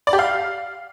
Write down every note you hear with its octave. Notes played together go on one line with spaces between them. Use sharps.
D5
G4
F5